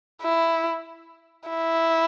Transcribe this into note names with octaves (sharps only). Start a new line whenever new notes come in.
E4
E4